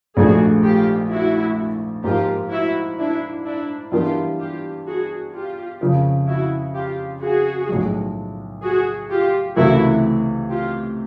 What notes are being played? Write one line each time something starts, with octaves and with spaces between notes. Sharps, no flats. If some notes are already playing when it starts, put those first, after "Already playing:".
A#1 G#2 F3 A3 D4 F#4 G#4
F4 G4
E4 F#4
G#2 F3 A#3 F4 G4
E4 F#4
D4 E4
D4 E4
G2 E3 G3 B3 F4 G4
F4 G4
F#4 G#4
F4 G4
F2 C#3 F3
E4 F#4
F4 G4
F#4 G#4
B1 A2 F3 G#3
F#4 G#4
F4 G4
C#2 C3 E3 A3 E4 F#4
F4 G4